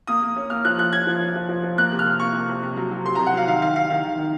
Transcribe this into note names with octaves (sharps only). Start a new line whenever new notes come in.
A#3 D#6
A#3
C#4
A#3 F6
F3 F#6
F3 F#6
C#4 G#6
F3
C#4
F3
F3
F3
A#3 F#6
C3
F6
C3
A#3 C#6
C3
C3
C3
F#3
F#3
C3 C6
A#5
C3
F#5
F#3 F5
D#3 F5
D#3 F5
D#3 F5
D#3 F5
D#3
D#3